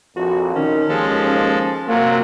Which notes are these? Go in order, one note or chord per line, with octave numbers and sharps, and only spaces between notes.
A#1 F2 F#4
D#3 C#4
D#2 F3 G#3 A4
C3 F#3 A#3 F4